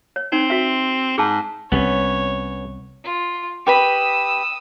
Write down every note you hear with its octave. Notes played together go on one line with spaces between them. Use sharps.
C#5
C4 D#4
F#4 E5
G#2 G#4 A5
C2 C3 B3 C#4 C#5
F4
G4 B4 B5 D#6 E6